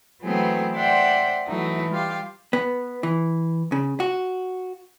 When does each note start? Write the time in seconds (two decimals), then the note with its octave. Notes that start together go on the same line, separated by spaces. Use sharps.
0.23 E3 F#3 A3 B3 C4 G#4
0.75 C5 D5 E5 F#5 G5 C6
1.46 E3 F#3 A3 D#4
1.90 G3 F4 G4 F5
2.53 B3
3.03 E3
3.72 C#3
4.00 F#4